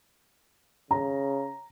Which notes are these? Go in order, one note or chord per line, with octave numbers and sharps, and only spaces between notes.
C#3 A#5